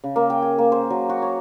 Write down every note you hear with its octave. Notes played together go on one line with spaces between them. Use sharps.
C#3
A#3
G5
G#5
A#3
C5
F#3
F#4
C#5